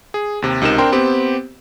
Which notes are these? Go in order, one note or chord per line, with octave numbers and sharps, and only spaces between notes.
G#4
D#2 C3
C#2 C3 D#4 A#4 E7
C4 D4 A#4 G5 C6
B3 C4 G4